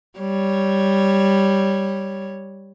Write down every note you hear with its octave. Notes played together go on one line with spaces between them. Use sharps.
G3 C#5